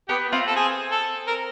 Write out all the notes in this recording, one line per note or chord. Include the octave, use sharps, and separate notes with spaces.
B3 G4
C4 F4
A4
G#4
A4
A#4